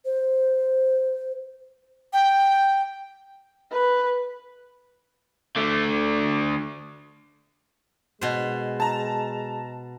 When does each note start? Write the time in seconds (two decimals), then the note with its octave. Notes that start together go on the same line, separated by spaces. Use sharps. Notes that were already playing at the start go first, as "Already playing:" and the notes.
0.05 C5
2.13 G5
3.72 B4
5.56 D3 A3
8.21 B2 G#3 C5
8.80 A5 A#5